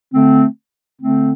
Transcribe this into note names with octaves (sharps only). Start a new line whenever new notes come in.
D3 A3 C4
D3 A3 C4